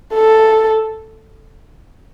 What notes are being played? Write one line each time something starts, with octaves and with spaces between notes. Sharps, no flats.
A4